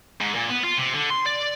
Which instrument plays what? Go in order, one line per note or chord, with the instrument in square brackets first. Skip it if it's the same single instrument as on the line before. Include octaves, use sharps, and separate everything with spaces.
[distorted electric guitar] G#2
A#2
B3
F4
C3
D3
C6
D5